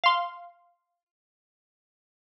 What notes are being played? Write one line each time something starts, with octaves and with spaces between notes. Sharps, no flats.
F5 C6